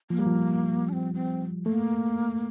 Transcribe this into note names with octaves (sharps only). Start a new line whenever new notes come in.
F3 A#3
G3
F3
D4
C4
C4
A3 A#3